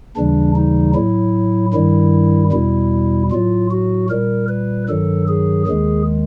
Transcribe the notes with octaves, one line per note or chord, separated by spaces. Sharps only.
D#2 C#3 E3 G3 D4
D#4
A2 F#3 E4
G2 D#3 G3 E4
E2 B2 G3 E4
A2 F#3 F4
F#4
A#2 G3 A#4
B4
G2 D#3 F#3 A4
G#4
D#2 D#3 G#3 G#4